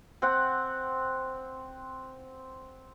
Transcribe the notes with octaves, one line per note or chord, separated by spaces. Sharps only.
C4 F#5